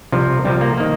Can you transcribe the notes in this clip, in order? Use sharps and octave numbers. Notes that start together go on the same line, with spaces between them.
C2 C3 F3
C2 C3 F3 G3
A#3
D#3 A#3